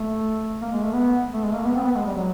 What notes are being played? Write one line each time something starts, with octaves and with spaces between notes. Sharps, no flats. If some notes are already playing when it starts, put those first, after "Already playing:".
Already playing: A3
A#3
G#3
A3
B3
A3
G#3
A#3
B3
C4
B3
G#3
G3
F#3